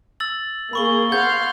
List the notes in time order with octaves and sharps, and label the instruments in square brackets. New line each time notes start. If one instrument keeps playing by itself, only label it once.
[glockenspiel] E6 A6 F#7
[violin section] A#3 G#4 [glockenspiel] B5 C#6 G7
[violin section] F5 F#5 C6 [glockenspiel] G6 G#6